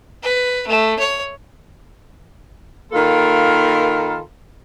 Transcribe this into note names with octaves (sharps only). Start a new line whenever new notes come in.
B4
A3
C#5
D#3 A#3 F4 A4 A#4 B5